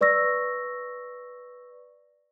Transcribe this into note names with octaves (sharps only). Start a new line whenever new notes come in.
B4 D5 C#6 E6 A#6